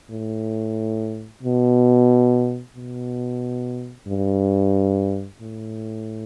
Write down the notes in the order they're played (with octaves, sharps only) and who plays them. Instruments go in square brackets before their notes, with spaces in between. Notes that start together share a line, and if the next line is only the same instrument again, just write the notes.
[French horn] A2
B2
B2
G2
A2